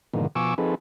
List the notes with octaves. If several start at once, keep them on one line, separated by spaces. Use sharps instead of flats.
G#2 B2 D3 D#3 F3 A#3
B2 F3 G#5 C#6 D6 E6
F3 C4 D#4 G#4 A4 B4